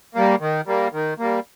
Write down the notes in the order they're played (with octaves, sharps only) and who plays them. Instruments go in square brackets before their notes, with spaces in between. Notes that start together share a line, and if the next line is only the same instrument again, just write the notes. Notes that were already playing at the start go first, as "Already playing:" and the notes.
[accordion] G3 A#3
D#3
G3 A#3
D#3
G3 A#3